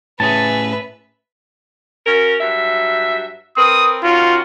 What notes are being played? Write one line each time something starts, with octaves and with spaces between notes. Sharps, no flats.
A2 C#4 G#4 B4 E5 A5
C#4 F#4 A#4
G2 F#3 E5
C4 A#4 B4 D#6
D#3 C#4 F4 F#4